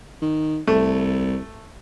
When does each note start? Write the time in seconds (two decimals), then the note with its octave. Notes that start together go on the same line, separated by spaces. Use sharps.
0.22 D#3
0.67 C2 A3